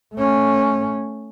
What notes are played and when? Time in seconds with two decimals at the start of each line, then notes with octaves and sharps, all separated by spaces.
0.14 A3 C#4